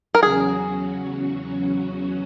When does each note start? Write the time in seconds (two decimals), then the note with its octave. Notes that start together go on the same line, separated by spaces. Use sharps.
0.15 A#4
0.23 E2 C#3 F#3 C#4 F#4 G#4